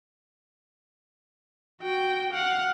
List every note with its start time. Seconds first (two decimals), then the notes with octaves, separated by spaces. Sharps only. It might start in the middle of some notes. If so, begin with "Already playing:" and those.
1.82 F#4 G5
2.33 F5 F#5